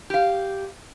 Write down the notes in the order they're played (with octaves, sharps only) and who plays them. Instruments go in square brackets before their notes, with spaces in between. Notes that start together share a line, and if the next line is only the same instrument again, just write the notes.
[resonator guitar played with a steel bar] G4 F5